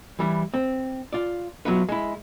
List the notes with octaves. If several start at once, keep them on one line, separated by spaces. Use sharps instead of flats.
E3 G3 E4
C4
F4 D5
F#3 B3 E4 F4 B4
G#3 E4